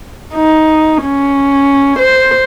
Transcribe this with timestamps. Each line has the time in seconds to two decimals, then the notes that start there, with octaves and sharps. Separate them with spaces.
0.34 D#4
1.03 C#4
1.99 C5